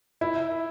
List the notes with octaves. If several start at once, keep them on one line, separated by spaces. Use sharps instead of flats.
E4